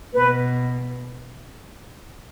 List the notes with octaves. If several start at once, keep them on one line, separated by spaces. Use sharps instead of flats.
B2 B4